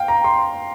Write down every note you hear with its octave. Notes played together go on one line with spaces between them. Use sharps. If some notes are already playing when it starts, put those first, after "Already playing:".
Already playing: F5 G5
A#5
C6